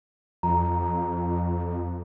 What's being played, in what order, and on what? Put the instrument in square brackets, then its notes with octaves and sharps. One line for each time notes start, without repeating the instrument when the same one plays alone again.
[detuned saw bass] F2 [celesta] A#5